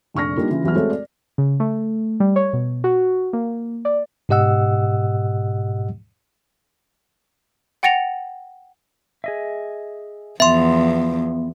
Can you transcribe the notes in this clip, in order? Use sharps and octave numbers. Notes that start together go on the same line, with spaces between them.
F1 A#1 C#6 F6 A#6
G3 A#3 D4 D#4 F4
C#3 E3 F4
E2 E3 F#3 B3 F#4 F6
G#3 A3 C4 F#4 A4 C#5
D5
C#3
A3
G3
C#5
B2
F#4
A#3
D5
G#2 B2 G4 D#5 F#5 E6
F#5 G5 A6 A#6 C#7 F7
G#4 D#5 E5
E2 F3 B3 E5 C6